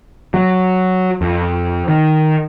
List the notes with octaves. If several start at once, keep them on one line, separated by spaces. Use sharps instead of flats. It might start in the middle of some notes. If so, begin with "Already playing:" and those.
F#3
F2
D#3